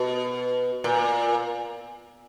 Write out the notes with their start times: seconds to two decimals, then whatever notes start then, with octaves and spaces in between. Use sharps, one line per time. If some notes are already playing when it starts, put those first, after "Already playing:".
Already playing: B2
0.84 A#2